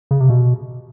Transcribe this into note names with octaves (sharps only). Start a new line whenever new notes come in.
C#3
C3
B2